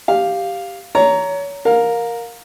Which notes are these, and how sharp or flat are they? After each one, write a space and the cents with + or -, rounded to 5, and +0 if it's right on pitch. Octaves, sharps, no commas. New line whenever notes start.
G4 +0 F5 +0
C#5 +30 A#5 -5
A#4 +0 F5 +25